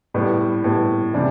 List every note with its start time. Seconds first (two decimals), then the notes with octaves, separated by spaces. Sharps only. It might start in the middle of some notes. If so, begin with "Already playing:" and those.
0.14 A2 G3 B3
0.64 A2 G3 B3
1.14 C3 E3 G3 D4